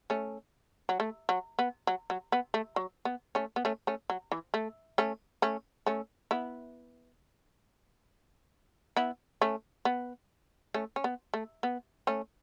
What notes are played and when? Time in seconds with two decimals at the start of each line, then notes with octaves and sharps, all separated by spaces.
0.10 A3 C#4
0.89 F#3
1.00 A3
1.29 F#3
1.59 B3
1.87 F#3
2.10 F#3
2.32 B3
2.54 A3
2.76 F#3
3.05 B3
3.35 A3 C#4
3.56 B3
3.65 A3 C#4
3.87 A3 C#4
4.10 F#3
4.32 E3
4.54 A3
4.98 A3 C#4
5.42 A3 C#4
5.86 A3 C#4
6.31 B3 E4
8.96 B3 E4
9.41 A3 C#4
9.85 B3
10.74 A3 C#4
10.96 C#4
11.04 B3
11.34 A3
11.63 B3
12.07 A3 C#4